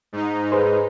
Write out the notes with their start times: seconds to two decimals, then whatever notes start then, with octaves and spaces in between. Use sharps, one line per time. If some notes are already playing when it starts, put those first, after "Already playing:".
0.13 G#2 D#4
0.52 G#4 B4 C5